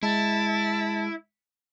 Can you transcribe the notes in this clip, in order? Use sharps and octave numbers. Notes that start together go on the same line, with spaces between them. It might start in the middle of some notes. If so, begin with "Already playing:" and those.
G#3 E4 A5